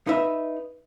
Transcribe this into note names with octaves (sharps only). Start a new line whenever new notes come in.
D#4 B4 E5